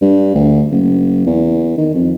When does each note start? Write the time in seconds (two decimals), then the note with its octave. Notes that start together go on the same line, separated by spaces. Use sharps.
0.01 G2
0.35 D2
0.71 F#1
1.26 E2
1.77 D#3
1.94 F2